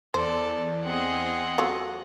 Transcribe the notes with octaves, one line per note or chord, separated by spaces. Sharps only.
E2 A4 C5 D5
C4 G#4 D#5 F#5
F#3 A3 F4